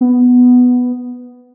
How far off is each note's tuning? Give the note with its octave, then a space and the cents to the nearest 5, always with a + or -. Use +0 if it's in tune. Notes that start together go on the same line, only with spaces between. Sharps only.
B3 +0